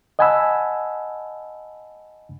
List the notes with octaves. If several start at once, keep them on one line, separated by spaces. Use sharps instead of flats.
D#5 F#5 G#5 A5 B5 E6